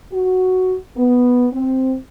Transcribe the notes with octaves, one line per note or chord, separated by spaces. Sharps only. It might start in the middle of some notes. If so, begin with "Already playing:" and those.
F#4
B3
C4